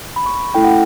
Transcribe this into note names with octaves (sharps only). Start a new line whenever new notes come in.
B5
C#6
B5
A3 C#4 E4 A4 G5
F#5